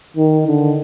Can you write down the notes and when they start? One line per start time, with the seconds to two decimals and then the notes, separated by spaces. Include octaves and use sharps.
0.16 D#3
0.47 D3